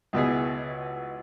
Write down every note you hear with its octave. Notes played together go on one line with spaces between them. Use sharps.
C#2 B2 B3 E4 G#4